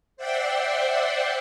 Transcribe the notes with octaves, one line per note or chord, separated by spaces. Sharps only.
C5 D5 E5 F#5 G5 C6